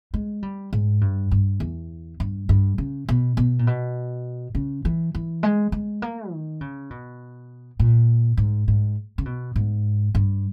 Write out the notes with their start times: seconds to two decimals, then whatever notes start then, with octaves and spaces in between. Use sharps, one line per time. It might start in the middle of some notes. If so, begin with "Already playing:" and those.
0.14 G#3
0.43 G3
0.73 G#2
1.01 G2
1.31 G2
1.60 E2
2.20 G2
2.49 G2
2.78 C#3
3.08 B2
3.37 B2
3.59 A#2
3.67 B2
4.55 C#3
4.85 E3
5.15 E3
5.43 G#3
5.72 G#3
6.02 A#3
6.31 D#3
6.61 C#3
6.90 B2
7.79 A#2
8.37 G#2
8.68 G#2
9.18 C#3
9.26 B2
9.56 G#2
10.15 G2